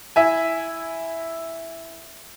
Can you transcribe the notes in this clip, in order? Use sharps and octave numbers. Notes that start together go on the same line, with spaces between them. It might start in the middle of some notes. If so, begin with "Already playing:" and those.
E4 E5 G#5